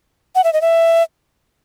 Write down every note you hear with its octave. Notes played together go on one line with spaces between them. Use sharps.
F#5
E5
D#5
E5